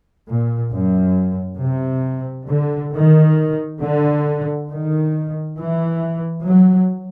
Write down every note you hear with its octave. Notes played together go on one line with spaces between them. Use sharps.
A#2
F#2
C3
D3
D#3
D3
D#3
E3
F#3